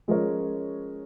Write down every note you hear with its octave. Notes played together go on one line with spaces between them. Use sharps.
F3 G#3 C#4 A#4 C#5